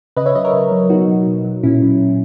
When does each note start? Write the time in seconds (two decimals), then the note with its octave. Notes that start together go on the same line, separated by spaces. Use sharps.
0.17 C#3 B4 D#5
0.26 C#5 E5
0.35 F#3 B4 D#5
0.44 A#4 C#5
0.53 C#3
0.72 F#3
0.90 B2 D#4 F#4
1.08 F#3
1.26 B2
1.45 F#3
1.63 A#2 C#4 E4
1.82 F#3
2.00 A#2